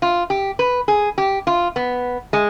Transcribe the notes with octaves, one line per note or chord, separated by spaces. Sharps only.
F4
G4
B4
G#4
G4
F4
B3
G#3